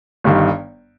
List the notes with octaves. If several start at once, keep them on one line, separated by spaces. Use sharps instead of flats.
G1 G2 D#3